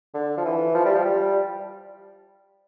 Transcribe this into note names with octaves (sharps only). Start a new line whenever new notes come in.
D3
F3
E3
F3
G3
F3
G3